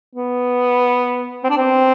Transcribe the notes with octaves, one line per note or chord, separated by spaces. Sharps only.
B3
C4
D4
C4